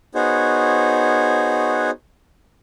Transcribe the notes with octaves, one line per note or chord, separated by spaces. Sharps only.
B3 D#4 F#4 G#4 C5 C#5